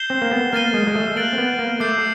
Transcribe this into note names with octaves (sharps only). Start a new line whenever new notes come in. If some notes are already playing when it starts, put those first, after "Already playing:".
Already playing: G6 C7 E7 G7
C4
A#3
B3
A#3 F6 A6 C7 D#7 G7
G#3
G#3
A3
A#3 F#6 A6 D7 F#7
C4
B3
A#3
A3 D6 G6 C7